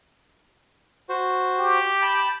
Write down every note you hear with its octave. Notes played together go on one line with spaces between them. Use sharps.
F#4 C5
G4
G5 A5 B5